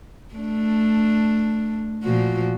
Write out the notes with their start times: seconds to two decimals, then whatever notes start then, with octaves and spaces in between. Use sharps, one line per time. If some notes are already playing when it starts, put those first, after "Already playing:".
0.35 A3 D4
2.04 A#2 F3 F#4